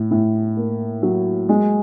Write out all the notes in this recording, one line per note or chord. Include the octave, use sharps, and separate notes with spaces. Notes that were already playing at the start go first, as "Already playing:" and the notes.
Already playing: A2
A2
A#3
F#3
G#3